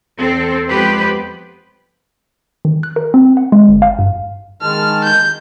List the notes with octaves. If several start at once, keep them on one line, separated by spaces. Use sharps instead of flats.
E2 C4 A4
F2 G#3 B3 G4 B4 C5
D#3
F#6
A#4
C4
F#5
G#3
G1
F5
G2
D#3 G#3 A5 F6
G6